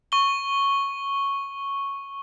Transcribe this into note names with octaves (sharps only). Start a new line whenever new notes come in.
C#6 G7